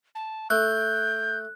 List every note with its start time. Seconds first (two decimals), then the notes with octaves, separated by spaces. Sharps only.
0.15 A5
0.50 A3 F#6 G6